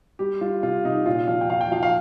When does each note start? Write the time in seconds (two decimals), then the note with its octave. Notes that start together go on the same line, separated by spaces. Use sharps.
0.19 G3 G4
0.41 G3 F4
0.63 C3 F4
0.84 C3 D#4
1.06 A#2 F4
1.28 F3 F4
1.41 G5
1.49 F3 F5
1.61 G5
1.72 F3 F5
1.83 F5